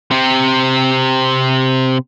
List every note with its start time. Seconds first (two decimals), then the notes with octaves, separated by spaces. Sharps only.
0.11 C3 C4